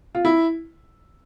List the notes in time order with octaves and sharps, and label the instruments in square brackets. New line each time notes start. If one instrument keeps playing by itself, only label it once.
[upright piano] F4
E4